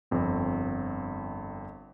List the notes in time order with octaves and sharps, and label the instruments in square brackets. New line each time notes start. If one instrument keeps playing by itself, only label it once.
[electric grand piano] G1 F2 C4